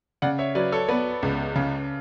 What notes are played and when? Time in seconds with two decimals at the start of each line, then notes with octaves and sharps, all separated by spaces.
0.22 C#3 D5 F#5
0.38 C#5 E5
0.55 F#3 B4 D5
0.72 A4 C#5
0.89 B3 B4 D5
1.23 C#2
1.55 C#3